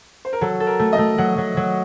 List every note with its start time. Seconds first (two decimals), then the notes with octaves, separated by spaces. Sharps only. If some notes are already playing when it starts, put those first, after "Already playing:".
0.25 C5
0.33 A#4
0.41 F#3 A4
0.60 A4
0.67 A#4
0.79 A3
0.93 D#5
0.98 A3
1.18 F#3 F#5
1.38 F#3
1.57 F#3